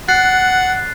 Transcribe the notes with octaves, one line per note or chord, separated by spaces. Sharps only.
F#5 F#6 A6 C7